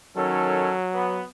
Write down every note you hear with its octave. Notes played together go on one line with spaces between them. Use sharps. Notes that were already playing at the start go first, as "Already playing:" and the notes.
D#3 F#3 C#4 A4
B3